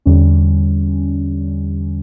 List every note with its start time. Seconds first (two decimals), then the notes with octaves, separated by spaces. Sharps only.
0.06 E2 D3 G3 C#4